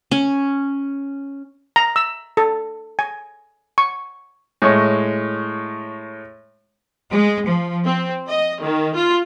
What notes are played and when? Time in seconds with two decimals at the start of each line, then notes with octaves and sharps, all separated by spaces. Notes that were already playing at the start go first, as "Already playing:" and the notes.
0.11 C#4
1.76 A#5
1.96 E6
2.37 A4
2.99 G#5
3.78 C#6
4.62 A2 G#3 C#5
7.11 G#3
7.47 F3
7.86 C4
8.28 D#5
8.62 D#3
8.95 F4